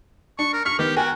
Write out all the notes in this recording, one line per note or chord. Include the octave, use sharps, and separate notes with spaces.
D4 C#6
A#4
C#6 F6 B6
D#3 B3 G4
F#4 A#4 G5 G#5